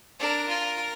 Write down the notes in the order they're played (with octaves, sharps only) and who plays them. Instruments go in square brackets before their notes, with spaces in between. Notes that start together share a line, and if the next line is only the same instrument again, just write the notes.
[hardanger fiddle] D4 [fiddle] A#4
[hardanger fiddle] F4